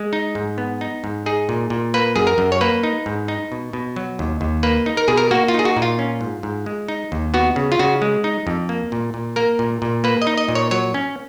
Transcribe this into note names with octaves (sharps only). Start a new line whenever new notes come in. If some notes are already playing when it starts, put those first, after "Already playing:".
Already playing: G#3
D#4
G#2
B3
D#4
G#2
D#4 G#4
A#2
A#2
A#3 B4
F#2 G#4
A#4
F#2
C#5
A#3 B4
D#4
G#2
D#4
B2
B2
F#3
D#2
D#2
A#3 B4
D#4
A#4
B2 G#4
A#4
A#3 F#4
F4
D#4 G#4
F#4
A#2
F4
C#4
G#2
G#2
G#3
D#4
D#2
B3 F#4
C#3
F4
C#3 F#4
G#3
D#4
F2
A#3
A#2
A#2
A#3 A#4
A#2
A#2
A#3 B4
D#5
D#4
D#5
A#2
C#5
F#3 C#5
C#4